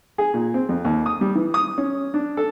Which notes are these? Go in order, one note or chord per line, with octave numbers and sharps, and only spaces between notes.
G#4
A#2
C4
F2
D#2
D#6
G3
E3
D#6
C#4
D4
A4